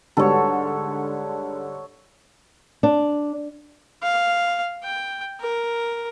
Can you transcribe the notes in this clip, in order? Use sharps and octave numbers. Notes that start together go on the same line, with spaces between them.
G#2 D3 G3 A4 C#5
D4
F5
G5
A#4